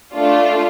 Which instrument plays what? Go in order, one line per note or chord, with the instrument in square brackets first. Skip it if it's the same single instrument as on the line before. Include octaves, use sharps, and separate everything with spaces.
[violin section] A3 D4 F4